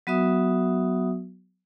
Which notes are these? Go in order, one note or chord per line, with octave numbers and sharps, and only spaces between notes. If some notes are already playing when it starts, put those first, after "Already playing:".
F#3 B3 F#4 E5 D#6